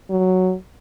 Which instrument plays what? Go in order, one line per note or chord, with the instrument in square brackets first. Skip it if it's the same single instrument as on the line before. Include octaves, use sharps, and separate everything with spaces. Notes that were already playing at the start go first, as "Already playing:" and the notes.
[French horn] F#3